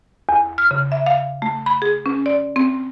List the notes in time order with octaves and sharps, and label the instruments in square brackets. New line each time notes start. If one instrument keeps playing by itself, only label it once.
[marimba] E2
F6
C#3
E5
F5
A3
B5
G#4
C#4
D5
C4